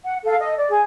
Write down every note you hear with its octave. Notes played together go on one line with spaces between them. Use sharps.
F#5
A4 F5
A4 D#5
D5
G#4